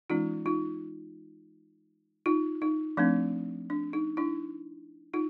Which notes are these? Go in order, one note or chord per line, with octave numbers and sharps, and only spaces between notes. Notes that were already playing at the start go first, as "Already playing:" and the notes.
E3 G#3 C#4 D#4 F4
D#4 F4
D#4 F4
D#4
F3 A3 C4 D4
D4
D#4
D4 E4
D#4 F4